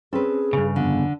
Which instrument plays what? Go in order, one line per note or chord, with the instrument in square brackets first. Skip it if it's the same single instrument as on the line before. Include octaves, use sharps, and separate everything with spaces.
[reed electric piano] C4 C#4 [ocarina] G#4 [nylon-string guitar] A4 B4
[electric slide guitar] G2 C#3
[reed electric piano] F2 [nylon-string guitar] D3 [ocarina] B3